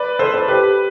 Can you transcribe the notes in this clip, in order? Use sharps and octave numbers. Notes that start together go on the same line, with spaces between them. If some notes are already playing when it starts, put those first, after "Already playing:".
Already playing: B4 D5
A4 C5
A4 C5
G4 B4